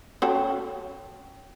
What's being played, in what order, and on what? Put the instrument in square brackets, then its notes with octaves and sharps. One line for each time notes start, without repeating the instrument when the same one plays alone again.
[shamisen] C#4 F#4 A4 [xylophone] G5